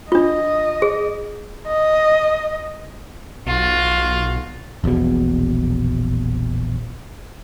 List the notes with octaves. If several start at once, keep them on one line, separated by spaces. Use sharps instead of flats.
D4 F4 D#5
G#4
D#5
B1 F4 F#4
D#1 A#1 E2 B2